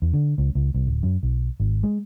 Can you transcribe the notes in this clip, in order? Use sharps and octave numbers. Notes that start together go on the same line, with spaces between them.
E2
D3
C#2
C#2
C2
D1
F#2
B1
G#1
G#3